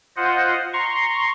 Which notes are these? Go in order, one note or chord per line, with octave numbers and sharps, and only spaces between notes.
F4 C5 D#5 F#5
A#5 C6 C#6